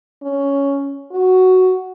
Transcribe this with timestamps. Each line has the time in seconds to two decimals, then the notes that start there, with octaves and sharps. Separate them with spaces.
0.23 C#4
1.12 F#4